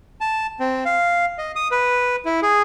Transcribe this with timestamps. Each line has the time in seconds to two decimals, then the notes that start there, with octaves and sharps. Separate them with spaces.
0.21 A5
0.60 C4
0.85 F5
1.38 D#5
1.56 D#6
1.71 B4
2.25 E4
2.43 G#4